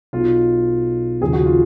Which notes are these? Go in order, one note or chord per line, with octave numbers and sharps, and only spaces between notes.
B1 B2 F4
D#2 C#3 F3 G#4
F#4
F4